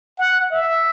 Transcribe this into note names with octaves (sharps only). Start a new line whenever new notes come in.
F#5
E5